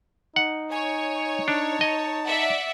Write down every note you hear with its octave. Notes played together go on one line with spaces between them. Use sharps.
D#4 F#5
C#5 G#5
D4 A5
D#5
D5 E5 F#5